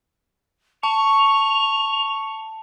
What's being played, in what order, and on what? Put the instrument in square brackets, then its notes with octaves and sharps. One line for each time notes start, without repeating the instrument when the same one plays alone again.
[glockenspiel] A5 [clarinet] C#6 [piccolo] F7